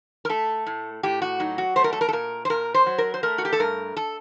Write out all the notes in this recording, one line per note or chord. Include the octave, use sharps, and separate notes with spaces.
A#4
A3 A4
A2
A2 G4
F#4
F#3 D#4
F#4
A3 C5
A#4
A4
A#4
A4
A#2 A#4
C5
A#2 A#4
C5
F#3
A#4
C5
A3 A#4
F#4
G4
A4
G2 A#4
A4